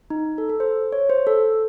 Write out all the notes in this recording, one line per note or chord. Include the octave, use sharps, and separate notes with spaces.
D#4
A4
A4
C5
C#5
C5
A4